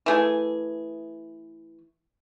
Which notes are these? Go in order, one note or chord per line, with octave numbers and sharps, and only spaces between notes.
E3 A3 G#4